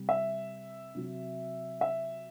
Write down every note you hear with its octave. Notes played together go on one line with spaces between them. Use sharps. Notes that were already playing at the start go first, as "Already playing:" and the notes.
Already playing: C3 G3
E5
C3 F#3
E5